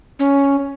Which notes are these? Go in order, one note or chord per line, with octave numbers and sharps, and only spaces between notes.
C#4